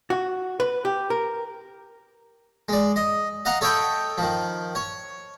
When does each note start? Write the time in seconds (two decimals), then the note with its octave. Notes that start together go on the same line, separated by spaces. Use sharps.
0.10 F#4
0.60 B4
0.85 G4
1.10 A#4
2.69 G#3 D5
2.96 D#5
3.45 D#5 F5 F#5 A#5
3.61 A4 C#5 D#5 E5 G5 B5
4.18 D#3 F3
4.75 C#5